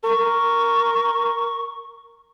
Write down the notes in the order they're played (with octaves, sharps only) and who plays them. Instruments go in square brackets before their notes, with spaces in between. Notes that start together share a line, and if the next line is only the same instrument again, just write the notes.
[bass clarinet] A#4 [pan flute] C#6